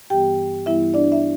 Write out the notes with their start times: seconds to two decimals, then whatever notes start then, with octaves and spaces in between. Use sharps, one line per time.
0.10 G2 E3 G3 B3 G4 G5
0.66 G2 E3 G3 B3 E4 E5
0.94 D4 D5
1.12 E5